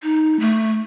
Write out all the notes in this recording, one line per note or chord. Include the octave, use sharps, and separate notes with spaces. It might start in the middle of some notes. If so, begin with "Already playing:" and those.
D#4
A3